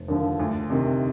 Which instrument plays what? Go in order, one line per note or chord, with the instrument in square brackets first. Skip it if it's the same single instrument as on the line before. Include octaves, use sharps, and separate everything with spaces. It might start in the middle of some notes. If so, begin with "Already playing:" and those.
Already playing: [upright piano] F1
D#2 D3 F3
D2
C3 D#3